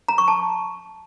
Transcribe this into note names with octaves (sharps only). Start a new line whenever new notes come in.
A#5
C#6
A5